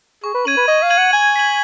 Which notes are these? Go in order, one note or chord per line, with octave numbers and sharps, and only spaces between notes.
G#4 C#6
B4
C#4 G#6 D#7 F#7
B4
D#5 C#6
F5
G#6 D#7 F#7
F#5
G#5 G#6
B6 F#7